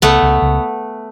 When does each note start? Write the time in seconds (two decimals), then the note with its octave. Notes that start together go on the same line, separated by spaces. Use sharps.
0.02 C#2 A3 B3
0.22 C#2
0.42 C#2